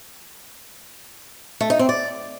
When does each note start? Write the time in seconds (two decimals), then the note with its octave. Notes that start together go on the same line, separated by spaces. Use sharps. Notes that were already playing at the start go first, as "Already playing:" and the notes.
1.61 A3
1.70 D#4
1.79 C4
1.89 D5